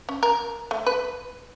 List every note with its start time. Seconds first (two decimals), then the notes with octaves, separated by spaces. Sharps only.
0.09 C#4
0.23 A#4
0.71 A3
0.86 B4